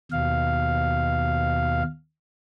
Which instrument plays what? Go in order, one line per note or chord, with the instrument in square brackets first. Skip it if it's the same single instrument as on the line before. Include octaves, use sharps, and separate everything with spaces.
[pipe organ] D#2 B2 F5